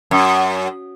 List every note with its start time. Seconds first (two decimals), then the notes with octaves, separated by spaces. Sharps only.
0.11 F#2